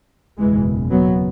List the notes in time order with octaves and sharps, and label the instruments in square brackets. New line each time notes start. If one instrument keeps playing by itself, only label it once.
[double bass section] F#1 E2 B2 E3 G#3
F#3 B3